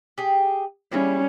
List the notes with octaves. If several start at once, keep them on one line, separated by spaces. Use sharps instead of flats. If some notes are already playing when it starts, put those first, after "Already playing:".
G4 G#4
G3 A#3 C#4 E4 G#4